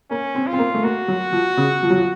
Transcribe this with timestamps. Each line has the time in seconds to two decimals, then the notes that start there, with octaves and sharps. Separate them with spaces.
0.10 A#3 C#4
0.35 C4
0.47 F4
0.53 C4
0.59 A#3
0.74 A3
0.83 A#3 F#4
1.08 F#3
1.32 F3
1.57 C#3
1.83 F3
1.90 F#3
1.98 F3